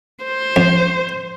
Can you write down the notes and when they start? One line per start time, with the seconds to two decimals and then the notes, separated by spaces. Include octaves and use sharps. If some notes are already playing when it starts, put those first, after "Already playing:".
0.24 C5
0.56 F2